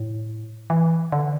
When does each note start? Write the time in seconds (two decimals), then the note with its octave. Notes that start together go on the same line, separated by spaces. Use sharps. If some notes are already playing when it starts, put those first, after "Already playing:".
Already playing: A2
0.70 E3
1.12 D3